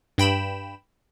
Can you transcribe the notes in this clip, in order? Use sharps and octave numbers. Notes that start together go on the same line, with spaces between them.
G2 G5 B5 E7